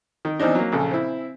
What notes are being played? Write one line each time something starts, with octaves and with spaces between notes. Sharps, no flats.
D#3
E2 E3 C4 D4 D#4
F#3 A#3
A#1 C#3 A4
C4 E4